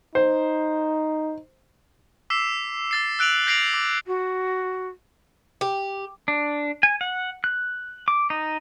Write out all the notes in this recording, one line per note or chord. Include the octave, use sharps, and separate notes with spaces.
D#4 C5
D6 E6 B6 C7 E7
E6 A6 C7
E6 F#6 D7 F7 F#7
G6 A#6 C7 D7 F7 F#7
D6
F#4
G4
D4
G#5
F#5
F#6
D6
D#4